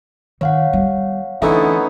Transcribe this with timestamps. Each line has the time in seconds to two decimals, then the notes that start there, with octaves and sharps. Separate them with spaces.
0.41 D#3 C#5 F5 F#5
0.73 G3 B3
1.42 D3 E3 A3 B3 C#4 D#4 E4